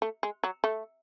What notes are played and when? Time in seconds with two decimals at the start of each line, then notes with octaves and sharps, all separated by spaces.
0.02 A3
0.23 G#3
0.44 F#3
0.64 A3